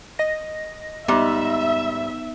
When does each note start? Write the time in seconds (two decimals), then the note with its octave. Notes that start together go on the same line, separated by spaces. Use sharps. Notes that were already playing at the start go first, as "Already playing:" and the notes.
0.19 D#5 A#6
1.08 G#2 G3 B3 D#4 E5